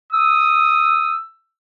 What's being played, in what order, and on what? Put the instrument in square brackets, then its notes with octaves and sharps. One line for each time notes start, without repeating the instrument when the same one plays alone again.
[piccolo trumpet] D#6 [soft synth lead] E6